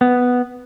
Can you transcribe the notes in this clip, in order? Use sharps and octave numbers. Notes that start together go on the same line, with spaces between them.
B3